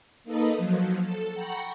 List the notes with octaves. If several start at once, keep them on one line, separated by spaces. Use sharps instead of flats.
A#3 D#4 A4 B4 D#5
F3 F#3
A4
F#5 G5 A#5 B5 C#6